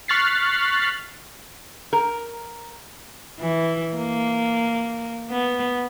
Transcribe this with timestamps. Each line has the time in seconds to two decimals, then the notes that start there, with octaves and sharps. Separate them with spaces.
0.08 C#6 F6 F#6 A6 B6 C7
1.93 A#4
3.40 E3
3.97 A#3
5.31 B3